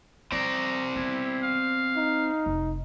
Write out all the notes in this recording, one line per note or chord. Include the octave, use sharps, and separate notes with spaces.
F3 C4 D5 A#5
D#3 B3 E4
F5
D#4
F1